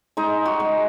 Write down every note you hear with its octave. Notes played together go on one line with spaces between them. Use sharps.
G#3 D#4
F#4
G#3